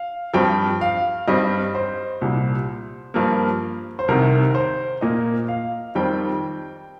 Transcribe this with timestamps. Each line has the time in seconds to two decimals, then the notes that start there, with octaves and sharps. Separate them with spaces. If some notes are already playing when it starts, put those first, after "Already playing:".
Already playing: F5
0.34 G2 F3 C4 G5
0.81 F5
1.28 G2 G3 C4 D#5
1.75 C5
2.21 C2 A#2 G3
3.14 G2 F3 A#3
3.99 C5
4.08 C2 C3 D#3 A#4
4.55 C5
5.01 A#2 A#3 D#5
5.48 F5
5.95 F2 D#3 G3 C4 G5